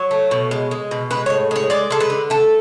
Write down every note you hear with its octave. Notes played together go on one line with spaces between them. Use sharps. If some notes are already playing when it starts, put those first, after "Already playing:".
Already playing: F#3 C#5
A3
B2
G#3
G#3
B2
G#3 B4
A2 C#5
G#3 C#5
G#3 D5
G#3 A4
B4
D3
A3 A4